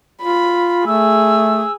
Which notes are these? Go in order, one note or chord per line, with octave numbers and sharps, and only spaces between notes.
F4 B5
A3 G#4 E6